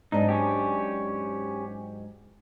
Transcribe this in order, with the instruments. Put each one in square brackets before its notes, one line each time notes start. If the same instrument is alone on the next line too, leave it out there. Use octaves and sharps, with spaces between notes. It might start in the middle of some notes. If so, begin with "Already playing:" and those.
[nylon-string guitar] G#2 F#3 D4 [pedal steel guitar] D#4
[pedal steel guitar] C#4 G4